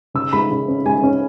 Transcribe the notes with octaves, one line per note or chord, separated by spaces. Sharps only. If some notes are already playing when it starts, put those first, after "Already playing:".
C#3 E6
G#3 B5
C#3
C#4
G#3 G#5
C#4